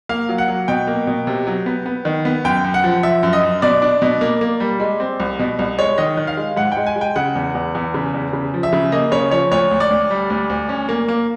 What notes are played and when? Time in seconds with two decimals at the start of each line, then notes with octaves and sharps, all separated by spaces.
0.09 A#3 F5
0.29 F#3
0.38 F#5
0.48 F#3
0.68 B2 G5
0.87 A#3
1.07 B2
1.27 C3
1.47 F#3
1.66 B3
1.86 B3
2.05 D#3
2.25 B3
2.45 F#2 G5
2.64 F#2
2.74 F#5
2.84 F3
3.03 F3 E5
3.23 F#2
3.33 D#5
3.43 F#2
3.62 B2 D5
3.82 D4
4.02 B2
4.21 A#3
4.41 A#3
4.60 G3
4.80 G#3
5.00 C4
5.20 C2
5.39 B2
5.59 C2
5.78 G#3 C#5
5.98 D#3 D#5
6.17 D#3
6.27 F5
6.37 G#3
6.57 G#2 F#5
6.72 G5
6.77 G#3
6.87 G#5
6.96 G#3
7.01 G5
7.16 C#3 F#5
7.35 E2
7.55 E2
7.75 E2
7.94 C#3
8.14 E2
8.33 C#3
8.54 F3
8.63 E5
8.73 C#3
8.92 A#3 D#5
9.12 C#3 C#5
9.31 F3 C#5
9.51 D2 C#5
9.71 D2
9.80 D5
9.90 D2
10.10 G3
10.30 D2
10.50 D2
10.69 C#4
10.89 A#3
11.08 A#3